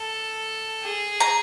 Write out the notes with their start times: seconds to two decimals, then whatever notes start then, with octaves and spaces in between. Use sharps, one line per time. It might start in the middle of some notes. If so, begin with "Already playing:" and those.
Already playing: A4
0.84 G#4
1.20 A#5